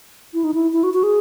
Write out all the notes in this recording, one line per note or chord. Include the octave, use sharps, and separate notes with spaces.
E4
D#4
E4
E4
F#4
F#4
G#4